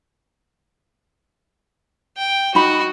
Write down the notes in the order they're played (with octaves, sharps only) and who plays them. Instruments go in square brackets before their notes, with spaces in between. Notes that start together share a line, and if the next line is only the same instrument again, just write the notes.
[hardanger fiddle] G5
[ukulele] D#4 B5 [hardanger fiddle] F#4